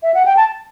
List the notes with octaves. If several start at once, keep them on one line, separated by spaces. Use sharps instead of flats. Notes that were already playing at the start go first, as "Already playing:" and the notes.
E5
F#5
G5
A5